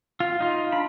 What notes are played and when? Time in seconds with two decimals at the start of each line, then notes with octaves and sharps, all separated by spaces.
0.20 F4
0.40 D#4 F4
0.72 D4 B5